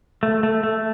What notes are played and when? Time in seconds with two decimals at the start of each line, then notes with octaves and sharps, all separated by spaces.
0.23 A3
0.43 A3
0.63 A3